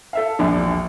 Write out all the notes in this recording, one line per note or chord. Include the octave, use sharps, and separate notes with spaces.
A4 E5 F5
E1 A#1 D#2 F3 D4